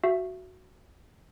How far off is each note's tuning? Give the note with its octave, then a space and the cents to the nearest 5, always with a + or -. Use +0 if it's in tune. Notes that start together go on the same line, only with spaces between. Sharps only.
F#4 +0 E5 +30